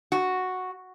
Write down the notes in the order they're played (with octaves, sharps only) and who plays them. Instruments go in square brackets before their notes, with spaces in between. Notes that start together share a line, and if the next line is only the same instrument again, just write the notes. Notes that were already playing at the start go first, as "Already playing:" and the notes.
[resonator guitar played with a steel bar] F#4